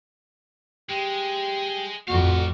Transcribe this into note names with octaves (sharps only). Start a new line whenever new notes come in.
G#3 G4
A1 F2 F#4 D5 F5